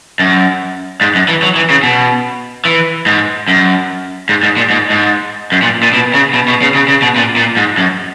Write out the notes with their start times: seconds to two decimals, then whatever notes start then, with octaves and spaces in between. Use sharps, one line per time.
0.19 F#2
1.01 G#2
1.15 F#2
1.28 E3
1.42 F#3
1.56 E3
1.70 C#3
1.83 B2
2.65 E3
3.06 G#2
3.48 F#2
4.29 G#2
4.43 G#2
4.57 A#2
4.70 G#2
4.90 G#2
5.52 F#2
5.63 A#2
5.83 A#2
5.93 B2
6.14 C#3
6.34 B2
6.48 B2
6.62 C#3
6.75 C#3
6.88 C#3
7.02 B2
7.16 A#2
7.36 A#2
7.57 G#2
7.78 F#2